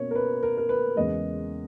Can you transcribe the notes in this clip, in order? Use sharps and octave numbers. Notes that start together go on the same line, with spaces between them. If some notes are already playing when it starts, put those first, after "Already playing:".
Already playing: B2 A#3 C#4 A#4 C#5
A#4
B4
A#4
A#4
B4
E2 C#3 G#3 D#5